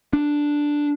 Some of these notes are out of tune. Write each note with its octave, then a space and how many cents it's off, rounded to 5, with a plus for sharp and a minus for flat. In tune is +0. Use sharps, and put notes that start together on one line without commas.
D4 +0